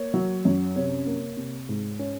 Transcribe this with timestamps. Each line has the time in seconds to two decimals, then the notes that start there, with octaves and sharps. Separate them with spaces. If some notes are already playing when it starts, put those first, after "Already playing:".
Already playing: A#3 C#5
0.14 F#3
0.45 F#2
0.76 C3 C#5
1.07 A#3
1.37 C3
1.69 G#2
1.99 C#4